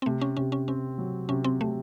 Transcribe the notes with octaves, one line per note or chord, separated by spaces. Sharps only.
C4
C3 A3
C#4
C3 C#4
C#4
C4 C#4
F#3
C3 C#4
C4
C3 A3